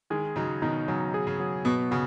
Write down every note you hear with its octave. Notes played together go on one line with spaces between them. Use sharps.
D#3 G#3 G#4
C#3 F#3 D#4
B2 D#3 D#4
C#3 F#3
G#4
C#3
F#3
B2 B3
C#3 F#4